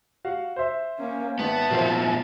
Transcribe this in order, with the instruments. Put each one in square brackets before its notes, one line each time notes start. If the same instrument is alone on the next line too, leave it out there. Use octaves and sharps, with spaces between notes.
[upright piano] F#4 F5 F#5
C5 E5
[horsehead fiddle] A#3 C#4
[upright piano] G#1 [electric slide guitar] B3 B4 [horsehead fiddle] E5 A5
[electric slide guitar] A#2 F3 B3 [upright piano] F#4 A#4 C5